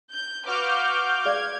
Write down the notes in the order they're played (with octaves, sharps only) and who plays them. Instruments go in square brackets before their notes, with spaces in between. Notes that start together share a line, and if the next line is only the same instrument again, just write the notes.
[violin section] G6
[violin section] F#4 B4 F5 [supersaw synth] D6 F6 G6
[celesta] G#4 D5 F5 [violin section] G#6